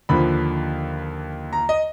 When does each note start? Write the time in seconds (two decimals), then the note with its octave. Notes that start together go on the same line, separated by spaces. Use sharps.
0.09 D#2 D3 F3 B5
1.53 A#5
1.69 D#5